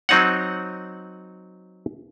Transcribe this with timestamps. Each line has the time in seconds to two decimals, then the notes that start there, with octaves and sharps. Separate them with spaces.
0.09 F#3 C4 D#4 C#5 F#5